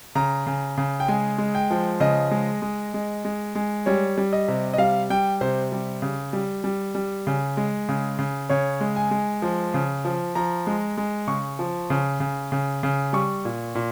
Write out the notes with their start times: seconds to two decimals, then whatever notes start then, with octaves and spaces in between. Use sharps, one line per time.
0.15 C#3 A#5
0.47 C#3
0.78 C#3
1.00 G5
1.08 G#3 G#5
1.38 G#3
1.55 G5
1.70 F3
2.00 C#3 D#5
2.31 G#3
2.62 G#3
2.94 G#3
3.25 G#3
3.55 G#3
3.86 G3 C#5
4.18 G3
4.33 D#5
4.48 C3
4.74 D#5
4.78 G3 F5
5.10 G3 G5
5.41 C3 C5
5.72 G3
6.02 C#3
6.33 G3
6.64 G3
6.95 G3
7.27 C#3
7.57 G#3
7.89 C#3
8.19 C#3
8.49 C#3 C#5
8.81 G#3
8.96 G#5
9.11 G#3
9.42 F3
9.74 C#3
10.05 F3
10.35 F3 A#5
10.67 G#3
10.98 G#3
11.27 C#3 C#6
11.59 F3
11.90 C#3
12.20 C#3
12.52 C#3
12.83 C#3
13.13 G3 C#6
13.45 A#2
13.75 A#2